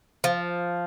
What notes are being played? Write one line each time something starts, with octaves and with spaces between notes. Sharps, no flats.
F3